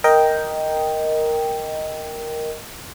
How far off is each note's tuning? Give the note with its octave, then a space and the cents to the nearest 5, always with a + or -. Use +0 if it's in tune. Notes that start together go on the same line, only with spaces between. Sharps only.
A#4 +0 D#5 +5 G5 +0